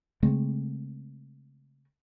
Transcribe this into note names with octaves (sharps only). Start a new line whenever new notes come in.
C#3 G#3 A3 C4